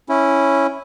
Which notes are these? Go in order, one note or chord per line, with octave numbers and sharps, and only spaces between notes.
C#4 E4